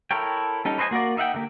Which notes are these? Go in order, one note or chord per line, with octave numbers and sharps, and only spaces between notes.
E4 A4 A#4 C#5 G5
G3 C#4 D#4 A4
B4 C5 D#5 F5 G#5
A#3 F#4 A#4 D5
D#4 E5 F#5 G5
D3 A#3 G4